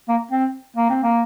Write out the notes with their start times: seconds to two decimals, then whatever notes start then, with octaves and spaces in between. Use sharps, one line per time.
0.09 A#3
0.31 C4
0.76 A#3
0.89 C4
1.03 A#3